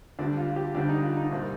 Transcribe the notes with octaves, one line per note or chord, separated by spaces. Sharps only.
D2 D3 G3 D4
F4
F4
G4
D2 D3 G3 D4
D#4
F4
D#4
C2 A#2 G3